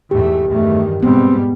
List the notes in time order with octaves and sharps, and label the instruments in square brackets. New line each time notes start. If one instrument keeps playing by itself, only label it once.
[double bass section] E2 G#2 A3 [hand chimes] G4
[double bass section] E2 G2 D#3 [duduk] A3
[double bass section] G#2 B2 G3 [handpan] B3 [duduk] C4